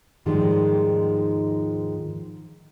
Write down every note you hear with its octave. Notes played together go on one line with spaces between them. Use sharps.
D#2 G#2 D#3 F3 G3 G#3